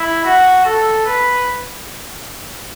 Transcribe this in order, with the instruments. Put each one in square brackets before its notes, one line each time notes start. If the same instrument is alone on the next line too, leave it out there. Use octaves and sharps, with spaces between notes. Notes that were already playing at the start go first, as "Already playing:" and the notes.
Already playing: [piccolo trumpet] E4
F#4
A4
B4